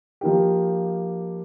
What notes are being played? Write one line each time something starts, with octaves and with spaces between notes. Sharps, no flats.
F3 A#3 D#4 G4